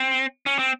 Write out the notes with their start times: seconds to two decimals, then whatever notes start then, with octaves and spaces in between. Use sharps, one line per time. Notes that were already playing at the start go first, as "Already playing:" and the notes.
Already playing: C4
0.46 C#4
0.59 C4